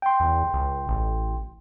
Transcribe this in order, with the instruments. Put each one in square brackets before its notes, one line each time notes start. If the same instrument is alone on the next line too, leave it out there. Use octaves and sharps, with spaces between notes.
[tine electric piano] G5 C6
[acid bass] E2
C#2
A1